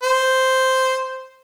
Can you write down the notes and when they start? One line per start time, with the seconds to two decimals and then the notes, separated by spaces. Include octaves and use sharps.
0.03 C5